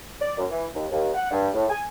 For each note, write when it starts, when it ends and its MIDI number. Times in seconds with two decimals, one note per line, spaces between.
0.21 0.34 74
0.38 0.45 42
0.50 0.66 52
0.75 0.85 39
0.91 1.09 39
1.14 1.27 78
1.31 1.48 43
1.54 1.64 45
1.70 1.83 80